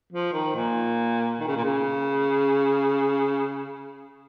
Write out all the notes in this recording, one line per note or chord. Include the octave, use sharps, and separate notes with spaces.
F3
D#3
A#2
D#3
C#3
A#2
C#3